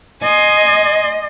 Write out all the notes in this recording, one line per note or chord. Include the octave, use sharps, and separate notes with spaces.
D#5 G#5 C6